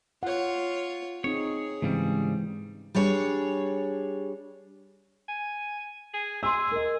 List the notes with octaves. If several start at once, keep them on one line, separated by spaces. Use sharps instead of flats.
F4 C#5 F#5
C4 D#4 G#4 C#5
G#2 C#3 E3 G3 G#3 C4
G3 D4 G#4 C#5
G#5
G#4
G#4 C6 E6
A#4 D#5